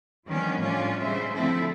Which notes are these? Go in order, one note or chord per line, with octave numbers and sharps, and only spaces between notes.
D#3 F3 G3 B3 C#4 D4
A2 G3 C#4 D4 F4
C#3 G3 G#3 C5 E5
D3 F3 A3 C4 E4 A4